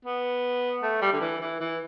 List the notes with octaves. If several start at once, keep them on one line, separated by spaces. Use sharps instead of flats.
B3
A3
G3
D3
E3
E3
E3